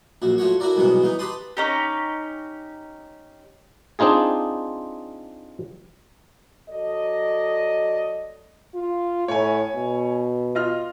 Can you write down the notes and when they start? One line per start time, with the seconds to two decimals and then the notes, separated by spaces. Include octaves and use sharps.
0.22 A#1 F#2 F#4
0.38 A3 F4 F#4 C#5
0.60 E4 F#4 A4 A#4 D5
0.77 C2 G#2 B2 E3 F#3 B3
1.02 E3 B3 D#4
1.19 G4 B4 A5 B5 C6 D#6
1.57 C#4 D#4 G4
3.99 C4 D4 D#4 F4 G#4
6.69 F#3 A4 D5 D#5
8.74 F4
9.28 A2 C#5 G#5
9.75 B2
10.55 F4 D#5 F6